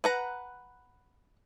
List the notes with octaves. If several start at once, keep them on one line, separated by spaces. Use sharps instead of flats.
B4 F#5 A#5